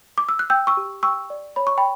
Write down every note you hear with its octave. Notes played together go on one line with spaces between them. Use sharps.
D6
E6
F#6
G5 E6 G6
C#6 E6
G4
G5 C#6 E6
D5
C#5 B5
C#6
G5 B5